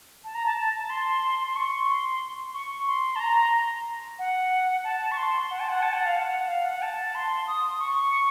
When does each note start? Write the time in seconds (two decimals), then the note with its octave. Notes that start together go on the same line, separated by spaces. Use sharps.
0.24 A5
0.35 A#5
0.46 A5
0.58 A5
0.90 C6
1.46 C6
1.56 C#6
1.89 C6
2.54 C#6
2.87 C6
3.16 A5
3.20 A#5
4.19 F#5
4.84 A5
5.12 C#6
5.17 C6
5.51 F#5
5.60 A5
5.69 F#5
5.83 A5
5.93 F#5
6.05 F5
6.16 F#5
6.48 F5
6.65 F#5
6.82 A5
7.15 C6
7.47 D#6
7.80 C#6